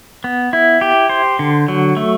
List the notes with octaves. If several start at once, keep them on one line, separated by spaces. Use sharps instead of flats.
B3
E4
G4
C5
D3
F#3
A3